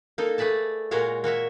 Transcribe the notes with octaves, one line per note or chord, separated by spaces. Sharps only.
A#3 D#4 A4
A3 G#4 B4 D5 A5
A#2 G#3 F#4 A#4 C#5 F5
A#3 F#4 C#5 E5